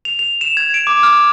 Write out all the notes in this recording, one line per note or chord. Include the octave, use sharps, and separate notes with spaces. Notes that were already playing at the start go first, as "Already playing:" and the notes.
F7
F7
E7
G#6
D7
D6
F6